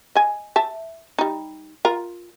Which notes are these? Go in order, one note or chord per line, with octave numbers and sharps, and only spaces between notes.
D#5 G#5
E5 A5
G3 D#4
F4 A#4